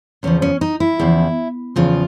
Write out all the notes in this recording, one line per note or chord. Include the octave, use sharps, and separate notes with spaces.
E2 C#3 F3 C#4
C#4
D#4
E4
E2 C#3 F3
E2 C#3 F3 F4